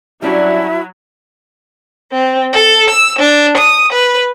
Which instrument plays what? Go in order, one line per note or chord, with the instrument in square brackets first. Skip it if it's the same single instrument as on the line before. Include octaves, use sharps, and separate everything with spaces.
[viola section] F#3 [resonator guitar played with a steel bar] G3 C#4 D4 [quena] E4 [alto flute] E5
[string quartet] C4
A4
E6
D4
D#6
B4